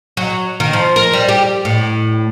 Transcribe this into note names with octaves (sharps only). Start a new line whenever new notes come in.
F#3
D#3
F3
A#4
G3
G4
A2